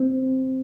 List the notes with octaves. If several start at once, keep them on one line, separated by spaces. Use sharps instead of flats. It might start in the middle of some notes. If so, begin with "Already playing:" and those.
Already playing: C4